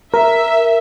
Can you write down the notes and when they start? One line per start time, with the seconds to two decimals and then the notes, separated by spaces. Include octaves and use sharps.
0.14 A#4 E5